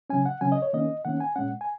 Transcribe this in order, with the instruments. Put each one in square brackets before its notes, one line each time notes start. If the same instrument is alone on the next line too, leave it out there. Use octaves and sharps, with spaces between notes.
[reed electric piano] C#3 F#3 C#4 G#5
F#5
C#3 F#3 C#4 G#5
D#5
C#5
D#3 A#3 C#4 D#5
D#3 A#3 C#4 F#5
G#5
A#2 G#3 C#4 F#5
G#5